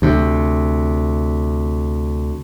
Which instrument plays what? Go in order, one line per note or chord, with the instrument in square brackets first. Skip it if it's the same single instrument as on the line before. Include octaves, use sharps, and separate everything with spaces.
[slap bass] D2 C3